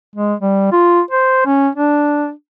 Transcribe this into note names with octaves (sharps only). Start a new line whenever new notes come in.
G#3
G3
F4
C5
C#4
D4